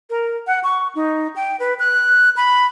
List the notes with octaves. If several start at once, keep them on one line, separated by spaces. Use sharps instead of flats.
A#4
F#5
C#6
D#4
G5
B4
F#6
B5